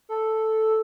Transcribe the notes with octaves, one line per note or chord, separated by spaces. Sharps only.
A4